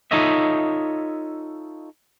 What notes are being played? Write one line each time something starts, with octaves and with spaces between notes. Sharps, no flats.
D#4 F4 A4 C#5 D#5 E5